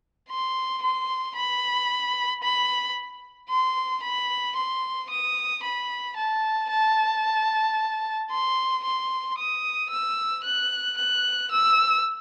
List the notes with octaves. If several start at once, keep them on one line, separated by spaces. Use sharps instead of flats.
C6
C6
B5
B5
C6
B5
C6
D#6
B5
A5
A5
C6
C6
D#6
E6
F#6
F#6
E6